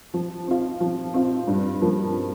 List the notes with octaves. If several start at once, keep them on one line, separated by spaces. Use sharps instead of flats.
F3
C4 F4
F3
C4 F4
G2
F3 A#3